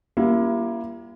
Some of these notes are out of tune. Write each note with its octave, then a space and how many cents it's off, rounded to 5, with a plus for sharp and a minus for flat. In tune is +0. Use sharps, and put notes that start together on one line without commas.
G3 +0 A#3 +25 E4 +35